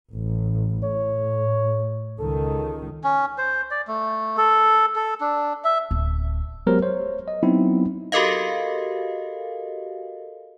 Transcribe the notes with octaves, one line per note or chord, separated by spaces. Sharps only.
A1
A2 C#5
C#2 D#3 A4
C#4
C5
D5
A3
A4
A4
D4
E5
D1
F#3 G#3 B3 G4 A#4 C5
C5 C#5
D#5
F#3 B3 C4 D#4 E4
F#4 G4 A4 A#4 D#5 F5